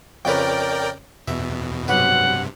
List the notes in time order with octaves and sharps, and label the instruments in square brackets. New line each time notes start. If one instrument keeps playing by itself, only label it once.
[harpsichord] F2 C#3 B4 [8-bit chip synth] A#4 D5 G5
[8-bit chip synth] E2 B2 [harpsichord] E5
[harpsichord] B1 B4 [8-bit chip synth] G2 C3 [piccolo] F#5